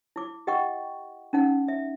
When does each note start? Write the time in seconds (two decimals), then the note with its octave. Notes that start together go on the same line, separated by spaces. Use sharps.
0.16 E4 D6
0.47 G4 D#5 F#5 G5 C#6
1.33 C#4 D#4 F#5
1.68 E5